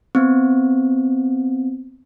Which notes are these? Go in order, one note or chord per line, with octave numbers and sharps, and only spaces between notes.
B3 C4